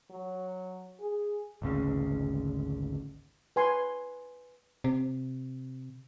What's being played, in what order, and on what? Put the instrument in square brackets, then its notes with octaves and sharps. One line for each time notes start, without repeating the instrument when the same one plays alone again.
[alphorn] F#3
G#4
[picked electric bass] G#1 D2 C#3
[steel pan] B4 G#5 C6
[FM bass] C3